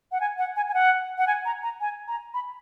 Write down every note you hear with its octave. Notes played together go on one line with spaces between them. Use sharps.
F#5
G#5
F#5
G#5
G#5
F#5
F#5
G#5
A#5
A#5
G#5
A#5
B5